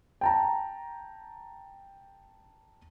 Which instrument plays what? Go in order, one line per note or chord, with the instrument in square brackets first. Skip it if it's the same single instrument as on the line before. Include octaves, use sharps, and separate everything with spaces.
[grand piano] G5 A5 A#5